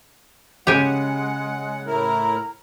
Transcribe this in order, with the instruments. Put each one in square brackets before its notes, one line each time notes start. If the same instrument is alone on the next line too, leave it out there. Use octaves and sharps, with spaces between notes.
[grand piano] C#3 [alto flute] G#3 [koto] G4 G#5 [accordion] F#5
[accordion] A2 E4 A#4 [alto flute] A#5